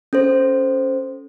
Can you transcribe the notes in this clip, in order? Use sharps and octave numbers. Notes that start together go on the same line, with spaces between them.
C#4 A4 C5